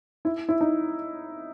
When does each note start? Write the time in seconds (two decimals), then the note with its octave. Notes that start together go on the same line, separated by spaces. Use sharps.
0.25 E4
0.49 E4
0.61 D#4